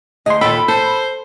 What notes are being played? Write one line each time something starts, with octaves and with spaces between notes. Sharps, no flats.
D2 G#4 D#5 C6
D#2 A#2 A4 G5 B5
A4 C5